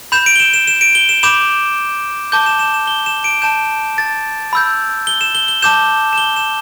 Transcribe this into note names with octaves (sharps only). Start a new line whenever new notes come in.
B5 G6 E7
D7
G7
E7
E7
E7
D7
G7
E7
B5 D6 G6 E7
A5 D6 G6 G7
E7
E7
E7
G7
E7
D7
A5 G6 E7
A6
B5 E6 G6
G7
E7
G7
G7
A5 D6 G6 E7
E7
G7
E7